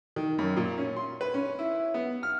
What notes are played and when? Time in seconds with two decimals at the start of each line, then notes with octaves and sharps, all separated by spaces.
0.16 D#3
0.39 F#2
0.57 A#2
0.78 C#4
0.97 C6
1.21 B4
1.34 C#4
1.59 E4
1.94 B3
2.23 F6